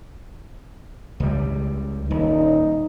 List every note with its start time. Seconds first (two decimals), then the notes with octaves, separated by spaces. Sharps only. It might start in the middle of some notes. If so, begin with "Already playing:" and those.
1.20 C#2 G3
2.11 D#1 D#4